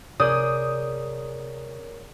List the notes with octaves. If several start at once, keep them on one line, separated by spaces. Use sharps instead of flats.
C3 G#4 A#4 C#5 D5 D#6 G6